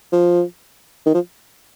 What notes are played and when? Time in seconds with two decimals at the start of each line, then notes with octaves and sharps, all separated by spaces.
0.12 F3
1.06 D#3
1.14 F3